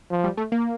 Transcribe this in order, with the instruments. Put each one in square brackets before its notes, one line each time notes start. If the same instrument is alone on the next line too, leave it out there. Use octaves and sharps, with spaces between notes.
[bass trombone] F3
[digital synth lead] G3
A3
A#3